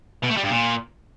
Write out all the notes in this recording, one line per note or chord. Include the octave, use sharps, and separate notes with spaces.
B2
A3
G3
G2
A#2